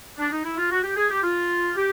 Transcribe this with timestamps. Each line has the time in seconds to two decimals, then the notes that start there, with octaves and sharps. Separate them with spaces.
0.18 D4
0.31 D#4
0.44 E4
0.57 F4
0.71 F#4
0.84 G4
0.96 G#4
1.10 G4
1.23 F4
1.75 G4